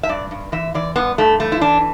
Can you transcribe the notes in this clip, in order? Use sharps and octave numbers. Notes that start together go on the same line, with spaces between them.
E5
G2 D5
G2
E3 E5
E3 D5
G2 B3
G2 A3
E3 A3
E4
E3 D4